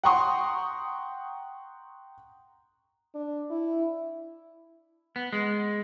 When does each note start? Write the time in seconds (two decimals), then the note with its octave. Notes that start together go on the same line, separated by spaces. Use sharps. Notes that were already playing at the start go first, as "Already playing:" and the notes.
0.04 F#5 G5 A#5 C6 C#6 D#6
3.14 D4
3.50 E4
5.16 B3
5.33 G#3